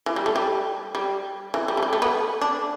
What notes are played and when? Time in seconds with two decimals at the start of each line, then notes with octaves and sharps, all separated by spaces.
0.06 E3
0.16 G3
0.26 A3
0.36 G3
0.95 G3
1.54 E3
1.68 G3
1.77 A3
1.83 G3
1.93 A3
2.02 B3
2.41 D4